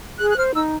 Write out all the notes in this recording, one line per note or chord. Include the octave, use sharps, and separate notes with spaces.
G#4 F#6
F#6
C5 F6
D#4 E6